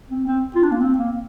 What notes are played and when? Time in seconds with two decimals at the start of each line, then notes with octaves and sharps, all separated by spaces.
0.10 C4
0.27 C4
0.55 F4
0.63 D4
0.72 A#3
0.80 C4
0.98 A#3